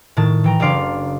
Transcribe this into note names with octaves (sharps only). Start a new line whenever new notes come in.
A2 D#3 A5 A6
E3 G5 A#5
F#1 C#3 D4 D5 F5 C6